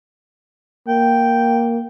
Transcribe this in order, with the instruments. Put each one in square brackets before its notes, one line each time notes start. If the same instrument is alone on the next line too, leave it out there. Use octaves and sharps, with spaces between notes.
[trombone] A#3 [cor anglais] G5